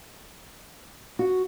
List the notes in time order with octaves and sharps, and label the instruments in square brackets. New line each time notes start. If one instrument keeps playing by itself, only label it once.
[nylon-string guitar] F#4